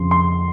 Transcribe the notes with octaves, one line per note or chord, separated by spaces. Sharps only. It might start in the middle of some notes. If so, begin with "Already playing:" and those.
Already playing: F2 C#3 F3 C6
C6